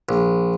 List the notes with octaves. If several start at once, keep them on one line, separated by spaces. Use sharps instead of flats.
A#1